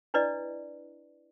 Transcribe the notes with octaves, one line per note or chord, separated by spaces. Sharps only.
D4 E4 B4 D5 D#5